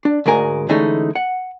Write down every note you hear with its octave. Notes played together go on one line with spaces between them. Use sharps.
D4
D2 G#2 G#3 A#4 G#5
D3 E3 G#3 A3 C#4 D#4
F#5